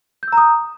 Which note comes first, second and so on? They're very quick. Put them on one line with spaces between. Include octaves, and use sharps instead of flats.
G6 E6 A#5 D#6